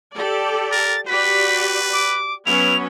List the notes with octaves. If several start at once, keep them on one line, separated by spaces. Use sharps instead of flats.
G4 A4 D5
A#4 A6
F#4 G4 B4 D5 B6
D6
F#3 B3 C#4 E4 F7